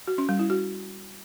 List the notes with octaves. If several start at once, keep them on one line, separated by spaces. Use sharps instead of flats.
F#4
C#4
G3
E4
F#4